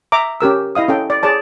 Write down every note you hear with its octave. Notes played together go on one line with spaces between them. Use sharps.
E5 A#5 D6
C#4 G4 A#4 E6
E4 D#5 F5 D#6
C#4 A4 G5
D5
G#4 C#5 D5 A5